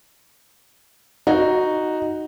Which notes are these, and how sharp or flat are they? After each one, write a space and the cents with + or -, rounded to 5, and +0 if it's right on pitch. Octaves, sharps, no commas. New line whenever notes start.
D#4 +0 F#4 +0